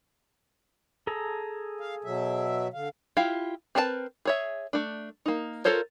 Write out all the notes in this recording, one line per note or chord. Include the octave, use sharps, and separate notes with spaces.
G#4 A4 A#5
F5
B2 F#3 E5
D3 F5
E4 F4 G4 F5
C4 A#4 B4 D5 A5
G#4 C#5 E5
A3 D4
A#3 D#4
F4 A4 A#4 C5 C#5